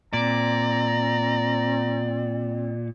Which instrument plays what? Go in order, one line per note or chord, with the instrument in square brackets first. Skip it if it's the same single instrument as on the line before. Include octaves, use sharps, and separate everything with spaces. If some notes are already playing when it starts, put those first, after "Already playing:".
[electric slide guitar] A#2 [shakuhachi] C4 [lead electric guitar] D5 [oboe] A#5